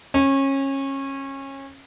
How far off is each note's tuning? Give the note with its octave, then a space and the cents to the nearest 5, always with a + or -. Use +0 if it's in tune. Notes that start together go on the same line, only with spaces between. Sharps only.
C#4 -25